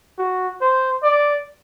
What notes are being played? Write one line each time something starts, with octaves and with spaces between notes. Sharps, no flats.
F#4
C5
D5